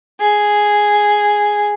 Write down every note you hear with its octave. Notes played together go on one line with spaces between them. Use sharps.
G#4